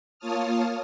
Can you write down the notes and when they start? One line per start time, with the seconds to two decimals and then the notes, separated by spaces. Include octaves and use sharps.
0.19 A#3 F4 C#5 A5 D#6 F6